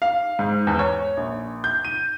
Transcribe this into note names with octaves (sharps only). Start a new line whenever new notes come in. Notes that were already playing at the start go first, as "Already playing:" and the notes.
F5
G#2
E2
C#5
A#1
G6
D#7